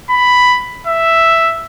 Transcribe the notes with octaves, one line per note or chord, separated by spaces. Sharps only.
B5
E5